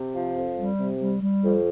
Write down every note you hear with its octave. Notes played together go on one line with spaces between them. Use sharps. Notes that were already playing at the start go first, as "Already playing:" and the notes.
Already playing: C3
F3
F2
G3
C3
G3
G3
F2